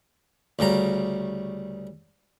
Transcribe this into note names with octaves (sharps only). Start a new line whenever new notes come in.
D2 C#3 G3 A#5